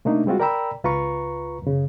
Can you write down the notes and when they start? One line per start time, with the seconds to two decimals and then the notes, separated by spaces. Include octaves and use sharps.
0.05 C3 A3 A#3 D4 D#4
0.26 G3 G#3 C4 F4 F#4
0.40 A#4 D5 G5 A#5 B5 E6
0.84 C#2 F4 B4 A#5 C#6
1.62 F#2 C#3